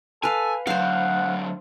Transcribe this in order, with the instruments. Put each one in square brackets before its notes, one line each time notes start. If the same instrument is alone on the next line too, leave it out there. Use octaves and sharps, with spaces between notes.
[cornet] A4 [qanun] B4 F5 [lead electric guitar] G#5
[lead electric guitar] D3 F#3 [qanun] C5 F5 [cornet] F#5